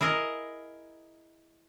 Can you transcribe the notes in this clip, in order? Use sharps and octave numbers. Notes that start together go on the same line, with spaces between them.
E4 G#4 A#4 D#5